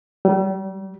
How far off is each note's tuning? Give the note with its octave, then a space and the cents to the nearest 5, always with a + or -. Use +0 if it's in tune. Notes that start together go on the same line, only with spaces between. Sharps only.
G3 -35